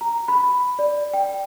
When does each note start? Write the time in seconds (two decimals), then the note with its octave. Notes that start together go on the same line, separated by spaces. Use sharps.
0.01 A#5
0.28 B5
0.79 D5
1.13 G5